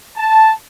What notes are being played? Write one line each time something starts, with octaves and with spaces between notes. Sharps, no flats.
A5